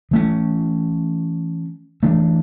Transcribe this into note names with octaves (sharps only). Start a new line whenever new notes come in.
E3 A3 C#4
E3 A3 D4